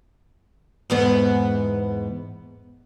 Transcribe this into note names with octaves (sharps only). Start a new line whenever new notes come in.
E2 G#2 B3